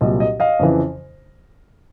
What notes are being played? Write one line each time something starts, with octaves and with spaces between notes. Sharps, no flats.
C2 A#2 F#3 D#5
D#5
D#5 F5
F2 C#3 E3